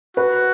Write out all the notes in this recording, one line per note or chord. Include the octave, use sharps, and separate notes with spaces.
F#4 B4